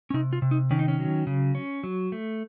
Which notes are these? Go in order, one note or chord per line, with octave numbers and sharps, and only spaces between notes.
C#4
C3 D#4
F4
C3
D#4
D#3 C#4
D#4
C#4
F#3
C#3
C#4
F#3
A3